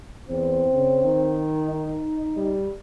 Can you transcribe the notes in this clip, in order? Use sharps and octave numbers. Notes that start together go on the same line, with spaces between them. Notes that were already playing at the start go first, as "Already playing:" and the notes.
E2 C4
C#3
D#3
D#4
G3